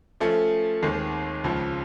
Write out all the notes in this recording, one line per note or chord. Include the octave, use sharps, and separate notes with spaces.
F3 A3 C#4
D#2 D#3 G#3 C4
C#2 C#3 F3